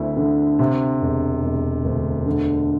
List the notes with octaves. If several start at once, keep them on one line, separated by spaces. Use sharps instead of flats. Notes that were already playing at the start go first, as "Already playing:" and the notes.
Already playing: D2 C4 E4
D3
C3
E1
E1
D2
D3